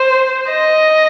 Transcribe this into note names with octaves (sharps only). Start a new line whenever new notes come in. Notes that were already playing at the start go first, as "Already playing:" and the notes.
Already playing: C5
D#5